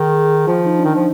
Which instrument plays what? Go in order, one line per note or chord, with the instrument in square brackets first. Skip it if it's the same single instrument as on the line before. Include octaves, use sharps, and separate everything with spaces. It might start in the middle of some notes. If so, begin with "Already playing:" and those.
Already playing: [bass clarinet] D#3 [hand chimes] G#4
[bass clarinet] F3 [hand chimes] F4
[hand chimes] D#4
D4
[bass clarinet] D#3 [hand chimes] D#4
[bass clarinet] F3